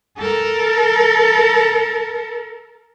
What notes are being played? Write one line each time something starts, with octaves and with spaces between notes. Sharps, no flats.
A4 A#4